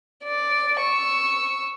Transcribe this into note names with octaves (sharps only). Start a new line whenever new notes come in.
D5
C#6 E6